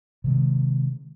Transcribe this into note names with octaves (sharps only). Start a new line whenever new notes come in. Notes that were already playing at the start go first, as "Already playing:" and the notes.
C3 D#3 G#3